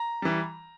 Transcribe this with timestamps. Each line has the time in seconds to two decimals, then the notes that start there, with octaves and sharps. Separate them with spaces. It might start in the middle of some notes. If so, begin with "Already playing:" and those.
Already playing: A#5
0.22 E3 G3